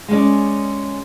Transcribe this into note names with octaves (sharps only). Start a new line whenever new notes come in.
G#3 C#4 D5